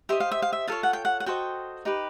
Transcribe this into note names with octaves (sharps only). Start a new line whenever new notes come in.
G4 C5 D#5 E5
F5
E5
F5
E5
F4 A4 C#5 F5
F#5
G5
F#5
F#5
F#4 A4 C5 D#5 G5
D#4 G4 B4